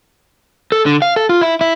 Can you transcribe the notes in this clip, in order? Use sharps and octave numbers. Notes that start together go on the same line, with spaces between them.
A4
D3
F5
A4
F4
E4
E4